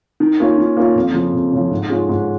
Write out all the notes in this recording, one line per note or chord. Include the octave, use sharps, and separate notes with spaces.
D#3
A#3 C#4 F4
D#3
A#3 C#4 F4
F2
C#3 F3
F2
C#3 F3
G#2
D#3 G#3 C#4 F4
G#2